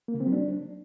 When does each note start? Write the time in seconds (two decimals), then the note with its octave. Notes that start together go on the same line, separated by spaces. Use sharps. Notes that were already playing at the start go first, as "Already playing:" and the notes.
0.08 A#3
0.14 C#3
0.20 C4
0.26 F#3
0.33 D4